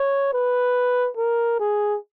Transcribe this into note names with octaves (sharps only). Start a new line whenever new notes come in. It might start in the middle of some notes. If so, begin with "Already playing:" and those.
Already playing: C#5
B4
A#4
G#4